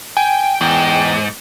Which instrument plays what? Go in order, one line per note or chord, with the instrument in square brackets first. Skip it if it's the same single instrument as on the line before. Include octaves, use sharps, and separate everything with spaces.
[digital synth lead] G5 [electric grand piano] G#5
[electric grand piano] E2 [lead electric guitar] G#2